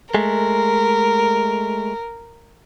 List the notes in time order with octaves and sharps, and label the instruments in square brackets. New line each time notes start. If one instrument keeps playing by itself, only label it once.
[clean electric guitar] G#3 A3 [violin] A#4